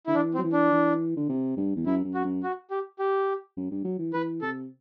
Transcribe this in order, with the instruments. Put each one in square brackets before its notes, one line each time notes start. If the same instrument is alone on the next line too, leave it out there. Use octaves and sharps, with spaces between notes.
[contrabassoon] D3 [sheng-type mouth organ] E4
[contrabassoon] E3 [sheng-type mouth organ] D4
[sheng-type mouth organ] C4
[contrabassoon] F#3
E3
[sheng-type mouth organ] D4
[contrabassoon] E3
D3
C3
G2
E2
[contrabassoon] F#2 [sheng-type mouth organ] E4
[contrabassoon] F#2
[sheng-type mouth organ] F#4
[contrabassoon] F#2
[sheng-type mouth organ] F#4
G4
G4
[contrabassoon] F#2
G2
F#3
E3
[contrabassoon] E3 [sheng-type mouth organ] B4
[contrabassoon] C3 [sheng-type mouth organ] A4